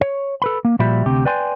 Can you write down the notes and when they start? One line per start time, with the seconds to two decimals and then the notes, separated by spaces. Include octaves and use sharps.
0.01 C#5
0.42 A4 B4 B5
0.65 A#3
0.79 A#2 F3 G3 F#4 E5 B5
1.06 D2 C3 G4
1.25 B4 D5 G5 G#5 C6